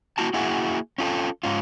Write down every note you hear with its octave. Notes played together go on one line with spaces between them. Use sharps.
A#3 E4 F#4 A5
A#3 E4 F#4 G#4 E5
C#4 F4 A4
G#2 C#4 F4